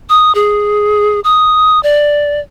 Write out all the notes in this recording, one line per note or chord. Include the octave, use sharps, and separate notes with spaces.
D#6
G#4
D#6
D5